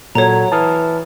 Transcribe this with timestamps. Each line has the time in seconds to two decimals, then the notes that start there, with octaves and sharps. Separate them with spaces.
0.15 A#2 F#3 A4 C#5 A#5 G#6
0.52 E3 A5 D#6 F6